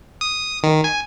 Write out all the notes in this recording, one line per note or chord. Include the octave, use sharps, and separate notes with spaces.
D#6
D#3
G#5